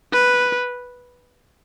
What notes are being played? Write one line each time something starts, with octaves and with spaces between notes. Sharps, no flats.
B4